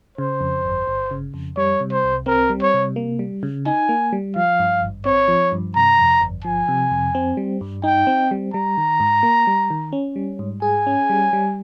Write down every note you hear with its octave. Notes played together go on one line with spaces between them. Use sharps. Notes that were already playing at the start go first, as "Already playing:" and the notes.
C#3 C5
F2
G1
G1
C#3
F2
G3 C#5
C3
C5
C2
C4 A#4
G3
C#5
C3
A#3
G3
C#3
D#4 G#5
A#3
G3
F3 F5
G2
G#1
C4 C#5
F3
G2
C3 A#5
F2
G1
F3 G#5
C3
F2
C4
G3
G2
D#4 G5
C4
G3
G3 A#5
D#3
G#2
A#3
G3
D#3
C#4
G3
G#2
G#4 G#5
C#4
G3
G3